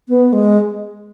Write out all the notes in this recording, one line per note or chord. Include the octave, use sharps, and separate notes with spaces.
B3
G#3